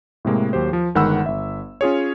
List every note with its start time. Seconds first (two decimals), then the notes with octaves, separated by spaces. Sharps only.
0.25 A2 C3 G#3 A#3
0.53 D#2 F#3 G4 C5
0.73 F3
0.95 G1 D#3 G#3 F#5 B5 E6
1.26 G1 E5
1.81 C#4 F4 G#4 C#5